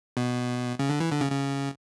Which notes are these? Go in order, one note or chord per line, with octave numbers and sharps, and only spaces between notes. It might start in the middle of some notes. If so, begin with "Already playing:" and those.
B2
C#3
D3
E3
D3
C#3
C#3